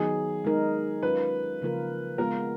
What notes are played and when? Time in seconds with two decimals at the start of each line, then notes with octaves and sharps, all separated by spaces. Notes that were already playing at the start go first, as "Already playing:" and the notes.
Already playing: D#3 F#3 B3 D#4 G#4
0.45 G#3 D#4 A#4
1.03 F#3 C#4 F4 B4
1.62 C#3 F3 A#3 F4 A#4
2.18 G#3 B3 F4 A#4